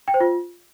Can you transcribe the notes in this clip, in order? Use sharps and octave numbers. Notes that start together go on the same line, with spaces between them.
G5
C5
F4